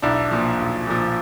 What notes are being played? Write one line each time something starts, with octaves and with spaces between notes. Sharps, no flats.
B1 D4 E4
A#2 F3
B1
A#2 F3